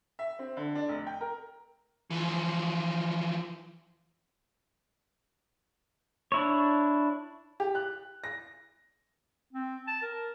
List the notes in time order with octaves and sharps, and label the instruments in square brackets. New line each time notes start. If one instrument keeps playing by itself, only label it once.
[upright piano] E5
C4
D3
D4
F1
G5
A#4
[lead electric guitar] E3 F3
[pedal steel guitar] D4 E4 C#5
[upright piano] G4
F#6
A#6
[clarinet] C4
A5
A#4